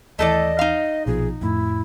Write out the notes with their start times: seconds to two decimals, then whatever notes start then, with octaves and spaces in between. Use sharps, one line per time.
0.19 D#2 E3 A3 A4 D5 D#5
0.59 D#4 F5
1.06 A#1 B2 F3 G#4
1.41 F2 A2 E4